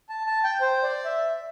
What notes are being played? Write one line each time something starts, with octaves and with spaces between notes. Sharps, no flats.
A5
A5
G5
C5
D5
E5